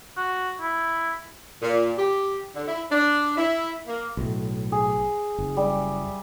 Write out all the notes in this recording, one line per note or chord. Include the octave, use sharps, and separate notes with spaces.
F#4
E4
A#2
G4
D3
E4
D4
E4
A#3
B1 A2
G#4
F#1
G3 E5